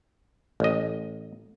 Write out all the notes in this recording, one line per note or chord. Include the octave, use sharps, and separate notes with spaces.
A1 D#5